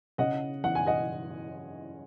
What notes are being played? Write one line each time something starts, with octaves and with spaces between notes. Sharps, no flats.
C#3 D#5 F#5
E3 F#5
G#5
D#5 F#5